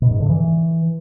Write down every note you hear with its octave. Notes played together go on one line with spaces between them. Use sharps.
B2
G#2
D3
E3